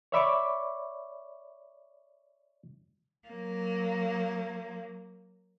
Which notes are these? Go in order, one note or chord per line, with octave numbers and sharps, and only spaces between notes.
C#5 D5 E5 B5 C#6 D6
F#3 A#3